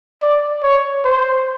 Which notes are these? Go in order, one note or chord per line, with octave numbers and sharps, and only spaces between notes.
D5
C#5
C5